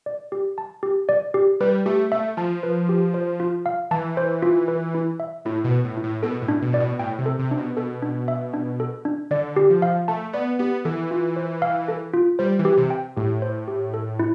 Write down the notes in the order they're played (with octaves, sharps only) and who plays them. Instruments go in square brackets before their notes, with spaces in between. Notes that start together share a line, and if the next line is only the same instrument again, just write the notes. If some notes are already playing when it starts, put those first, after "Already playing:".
[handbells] D5
G4
A5
G4
D5
G4
[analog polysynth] G3 [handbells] B4
[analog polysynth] A3 [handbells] G4
[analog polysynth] A3 [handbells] E5
[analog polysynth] F3 [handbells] A5
[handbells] B4
G4
C5
F4
F5
[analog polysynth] E3 [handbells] A5
[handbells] C5
F4
B4
E4
E5
[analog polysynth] A2 [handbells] E4
[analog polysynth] B2
[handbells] B4
[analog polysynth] A2
[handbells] E4
[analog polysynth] A2
[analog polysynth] B2 [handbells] A4
[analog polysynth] A2
[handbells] D4
[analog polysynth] B2
[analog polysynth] A2 [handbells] D5
[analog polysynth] B2
[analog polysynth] A2 [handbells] G5
[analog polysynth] C3
[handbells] A4
[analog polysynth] C3
[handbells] D4
[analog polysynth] B2
[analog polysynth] B2 [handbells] A4
[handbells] D4
E5
D4
A4
D4
[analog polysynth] D3 [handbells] D5
[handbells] G4
[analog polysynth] F3
[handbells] F5
[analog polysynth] A3 [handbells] A5
[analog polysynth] B3 [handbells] D5
[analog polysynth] B3 [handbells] G4
[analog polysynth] E3 [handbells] A4
[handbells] F4
C5
F5
A4
F4
[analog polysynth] G3 [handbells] C5
[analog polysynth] E3
[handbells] G4
[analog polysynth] C3
[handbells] G5
[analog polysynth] A2 [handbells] G4
[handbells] C5
G4
A4
E4